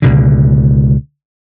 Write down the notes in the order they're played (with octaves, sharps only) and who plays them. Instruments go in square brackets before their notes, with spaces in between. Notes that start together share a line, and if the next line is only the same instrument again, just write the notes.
[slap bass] C#2 B2 D3